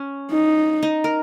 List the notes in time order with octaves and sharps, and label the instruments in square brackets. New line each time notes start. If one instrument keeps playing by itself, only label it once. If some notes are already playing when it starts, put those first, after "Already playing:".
Already playing: [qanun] C#4
[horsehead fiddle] D#4
[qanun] D#4
A#4